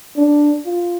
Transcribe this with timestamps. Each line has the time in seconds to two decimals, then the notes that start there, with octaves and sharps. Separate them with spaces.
0.17 D4
0.65 F4